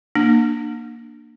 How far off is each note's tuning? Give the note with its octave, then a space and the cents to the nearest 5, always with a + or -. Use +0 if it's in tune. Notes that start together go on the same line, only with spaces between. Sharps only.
A#3 +0 D4 +20